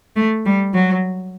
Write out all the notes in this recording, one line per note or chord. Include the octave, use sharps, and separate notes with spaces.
A3
G3
F#3